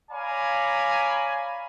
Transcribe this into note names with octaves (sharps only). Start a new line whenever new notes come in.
C#5 D5 F5 G#5 A#5 B5